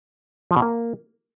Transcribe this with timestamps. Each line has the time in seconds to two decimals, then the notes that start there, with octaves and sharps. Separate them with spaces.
0.51 F3
0.56 B2
0.62 A#3